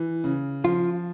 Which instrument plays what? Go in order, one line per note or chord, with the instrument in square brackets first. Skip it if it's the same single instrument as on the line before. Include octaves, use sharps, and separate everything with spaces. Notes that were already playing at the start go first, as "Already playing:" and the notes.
Already playing: [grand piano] E3
C#3
[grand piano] F3 [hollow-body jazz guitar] F4